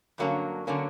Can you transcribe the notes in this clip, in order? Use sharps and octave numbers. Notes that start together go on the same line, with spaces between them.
G2 D3 F#3 A#3 C#4
D3 F#3 A#3 C#4